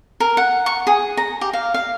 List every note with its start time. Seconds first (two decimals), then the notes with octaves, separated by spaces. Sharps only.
0.20 A#4
0.37 F#5
0.66 C#6
0.87 G#4
1.17 A#5
1.41 G4
1.53 F5
1.74 F5